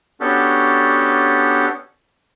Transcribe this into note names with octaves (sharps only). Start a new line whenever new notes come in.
B3 C#4 D4 F#4 G4 A4